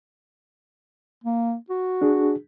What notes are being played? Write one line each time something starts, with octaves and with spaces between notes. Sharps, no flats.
A#3
F#4
D4 G#4